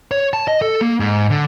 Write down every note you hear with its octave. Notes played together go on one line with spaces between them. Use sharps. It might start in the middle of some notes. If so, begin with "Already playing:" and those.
C#5
A5
D#5
A4
A#3
G#2
D3